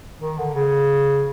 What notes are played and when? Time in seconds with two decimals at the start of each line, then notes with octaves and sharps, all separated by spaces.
0.19 D#3
0.38 D3
0.54 C#3